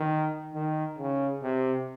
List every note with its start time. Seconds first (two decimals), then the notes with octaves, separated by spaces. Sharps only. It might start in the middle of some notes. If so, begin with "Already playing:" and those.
Already playing: D#3
0.54 D#3
0.98 C#3
1.43 C3